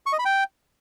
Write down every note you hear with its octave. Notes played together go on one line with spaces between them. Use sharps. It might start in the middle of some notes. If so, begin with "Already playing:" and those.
C#6
D#5
B5
G5